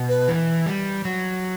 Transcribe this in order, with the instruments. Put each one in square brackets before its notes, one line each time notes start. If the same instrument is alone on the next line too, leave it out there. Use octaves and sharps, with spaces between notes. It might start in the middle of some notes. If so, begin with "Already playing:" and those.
Already playing: [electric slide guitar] B2
[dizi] B4
[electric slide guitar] E3
G3
F#3